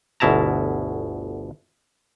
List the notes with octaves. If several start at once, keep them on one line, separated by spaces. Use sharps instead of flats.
G1 D2 B2 E4 A5 A#5